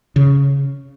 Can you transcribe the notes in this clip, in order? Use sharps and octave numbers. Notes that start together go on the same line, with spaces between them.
C#3